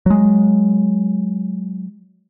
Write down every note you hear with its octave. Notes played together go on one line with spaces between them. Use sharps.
F#3 G#3